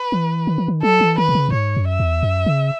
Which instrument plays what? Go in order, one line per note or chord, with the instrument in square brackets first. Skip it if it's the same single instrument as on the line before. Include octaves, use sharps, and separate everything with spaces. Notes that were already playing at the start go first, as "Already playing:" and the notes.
Already playing: [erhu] B4
[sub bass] E3
D#3
E3
D#3
[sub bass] F#3 [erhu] A4
[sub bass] E3
[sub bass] D#3 [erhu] B4
[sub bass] B2
C#3
F#2
[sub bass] G#2 [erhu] C#5
[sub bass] F#2
[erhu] E5
[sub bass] E2
F#2
C#3